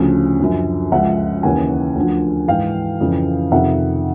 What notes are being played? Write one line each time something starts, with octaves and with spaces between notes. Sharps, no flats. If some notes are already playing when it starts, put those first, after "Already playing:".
Already playing: D2 C#3 F3
F#2 D3 F3
C#2 C#3 F3 E5 F#5
D#2 C#3 E3 F#5 G#5
D2 D3 F3
G#2 E3 F5 G5
F2 C#3 E3
F2 C3 D#3 E5 F#5